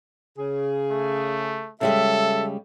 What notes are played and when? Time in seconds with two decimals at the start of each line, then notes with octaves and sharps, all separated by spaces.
0.37 C#3 G#4
0.91 A3
1.81 C#3 G3 G#3 A4 E5